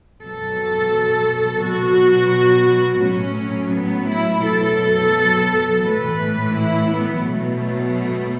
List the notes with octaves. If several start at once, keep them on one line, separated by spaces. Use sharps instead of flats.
B2 F#3 A4
B2 F#3 F#4
A2 F#3 C#4
B3
E4
B2 F#3 A4
A2 E3 B4
E4
B3
B2 F#3 A3